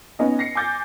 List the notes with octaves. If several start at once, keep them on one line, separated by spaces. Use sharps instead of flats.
B3 C#4 D#4 D#5
A#6 C7 C#7
G#5 D6 G6 A6 A#6